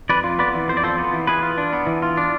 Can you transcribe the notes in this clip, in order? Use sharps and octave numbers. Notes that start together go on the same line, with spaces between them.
F2 B4 D5
F4
B3 B4 D5
E3
F2 C5
D5
F4 A4 C5
B3
E3
E3 G#4 B4
F4
D4
B3
E3
F4
D4